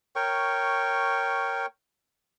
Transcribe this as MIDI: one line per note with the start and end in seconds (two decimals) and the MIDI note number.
0.16 1.66 70
0.16 1.66 73
0.16 1.66 79
0.16 1.66 85